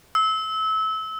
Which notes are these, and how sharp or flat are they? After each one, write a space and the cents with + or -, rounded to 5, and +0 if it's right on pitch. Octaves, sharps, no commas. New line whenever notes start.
E6 -25